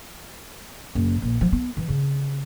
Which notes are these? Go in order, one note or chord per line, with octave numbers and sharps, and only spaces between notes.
F#1
A#1
F3
B3
E3
C#3